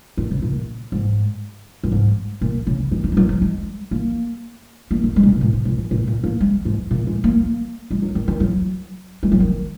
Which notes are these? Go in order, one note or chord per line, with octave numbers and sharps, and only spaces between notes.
D#3
C#3
A#2
G#2
F#2
G#2
A#2
C#3
D#3
D#3
G#3
F#3
F#3
G#3
A#3
A#3
D#3
G#3
C#3
A#2
A#2
G#2
A#2
G#2
A#2
A#2
A#3
G#3
G#2
A#2
G#3
A#3
A#3
G#3
F#3
D#3
D#3
F#3
G#3
F#3
D#3